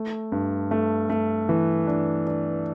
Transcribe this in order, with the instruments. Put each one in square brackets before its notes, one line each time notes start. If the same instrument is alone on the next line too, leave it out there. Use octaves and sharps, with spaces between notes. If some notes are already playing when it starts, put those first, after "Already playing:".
Already playing: [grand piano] A3
G2
A3
A3
E3
D4
D4